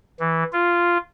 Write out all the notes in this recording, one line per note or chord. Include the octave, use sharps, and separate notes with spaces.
E3
F4